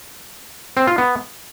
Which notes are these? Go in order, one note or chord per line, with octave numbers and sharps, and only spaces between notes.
C4
F4
B3